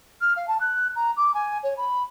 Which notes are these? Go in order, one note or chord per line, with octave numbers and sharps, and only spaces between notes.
F6
F5
A5
F#6
A#5
D6
G#5
C#5
B5